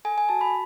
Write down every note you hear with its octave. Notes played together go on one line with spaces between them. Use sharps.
A4 G#5
G#5
F#4 A5
B5